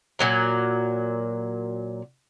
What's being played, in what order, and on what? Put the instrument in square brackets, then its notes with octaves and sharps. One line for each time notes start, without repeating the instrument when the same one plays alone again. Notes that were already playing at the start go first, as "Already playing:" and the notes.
[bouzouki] A#2 F#3 A#4